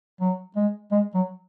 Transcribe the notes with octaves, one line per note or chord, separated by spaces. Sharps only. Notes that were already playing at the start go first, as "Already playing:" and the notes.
F#3
G#3
G#3
F#3